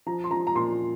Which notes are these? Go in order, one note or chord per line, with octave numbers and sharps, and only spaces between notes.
F3 A#5
C6
F3 A#5
A#5
A#2 C6